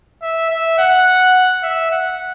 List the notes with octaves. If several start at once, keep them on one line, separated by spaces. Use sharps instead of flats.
E5
E5
F#5
E5
F#5